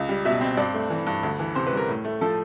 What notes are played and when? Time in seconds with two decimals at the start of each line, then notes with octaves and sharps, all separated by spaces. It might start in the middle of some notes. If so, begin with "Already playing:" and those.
Already playing: C#2
0.09 G3
0.25 B2 E5
0.41 C4
0.57 G2 D5
0.74 A3
0.90 E3
1.06 G2
1.23 D2
1.39 E3
1.55 C3 C5
1.67 B4
1.72 G3
1.77 A#4
1.89 A2
2.05 A3
2.21 F3 A4